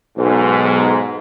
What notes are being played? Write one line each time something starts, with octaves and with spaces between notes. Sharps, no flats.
B1 G#2